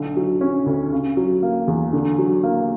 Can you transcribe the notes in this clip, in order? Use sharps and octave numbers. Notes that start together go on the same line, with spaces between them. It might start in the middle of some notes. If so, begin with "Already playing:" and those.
Already playing: B1 D3
F#3
C#4
D2
C#3
F#3
A#3
E2
D3
F#3
A#3